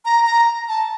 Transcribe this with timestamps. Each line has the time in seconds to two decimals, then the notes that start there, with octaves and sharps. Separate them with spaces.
0.05 A#5
0.27 A#5
0.69 A5